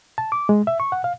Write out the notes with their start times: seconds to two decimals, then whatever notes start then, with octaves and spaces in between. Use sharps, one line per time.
0.18 A5
0.32 D6
0.49 G#3
0.67 E5
0.80 C#6
0.92 F#5
1.04 F5